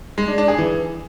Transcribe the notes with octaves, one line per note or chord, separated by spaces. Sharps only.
G#3
D4
D4
G#4
E3